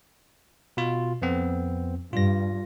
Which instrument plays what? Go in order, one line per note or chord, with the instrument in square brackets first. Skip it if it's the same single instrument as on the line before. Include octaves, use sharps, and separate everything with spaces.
[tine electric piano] B2 F4
F2 B3 C4
[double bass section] G2 [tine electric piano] F4 A#6